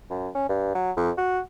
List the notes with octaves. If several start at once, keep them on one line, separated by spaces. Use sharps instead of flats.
F#2
C#4
G2
F#3
F2
F#4